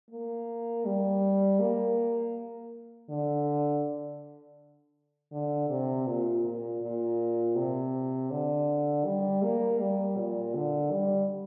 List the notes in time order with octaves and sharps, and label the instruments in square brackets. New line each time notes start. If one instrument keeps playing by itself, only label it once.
[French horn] A#3
G3
A#3
D3
D3
C3
A#2
A#2
A#2
C3
D3
G3
A#3
G3
A#2
D3
G3